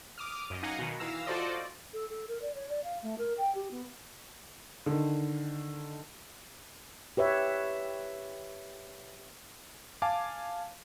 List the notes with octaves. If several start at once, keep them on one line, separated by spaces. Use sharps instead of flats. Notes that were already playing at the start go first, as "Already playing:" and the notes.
D6 D#6 F6
F#2 D#5
D#4 D#5 F5 F#5 G#5 A#5
B2 D#3
E3 F5 E6 A#6
F4 F#4 A4 C5 D5 D#5
A4
A4
A#4
D5
C#5
D5
F5
A3
A#4
G5
G4
B3
D3 D#3
G4 B4 C#5 E5
F5 G#5 A5 D6